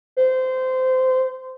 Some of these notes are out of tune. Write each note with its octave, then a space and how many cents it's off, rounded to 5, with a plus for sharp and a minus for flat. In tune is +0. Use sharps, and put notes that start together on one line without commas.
C5 -20